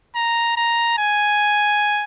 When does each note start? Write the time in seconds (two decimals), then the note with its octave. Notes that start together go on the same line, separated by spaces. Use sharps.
0.15 A#5
0.57 A#5
0.98 G#5